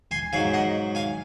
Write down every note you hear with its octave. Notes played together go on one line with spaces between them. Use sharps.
G#5 C6
G#2 F#3 F5 G#5
D#5 F#5
F5 G#5